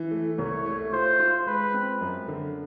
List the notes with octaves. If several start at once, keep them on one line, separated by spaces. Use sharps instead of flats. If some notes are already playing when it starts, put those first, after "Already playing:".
Already playing: E3
A3
C2 C#5
A3
F4 C5
F4
G#3 B4
C4
F#2
D3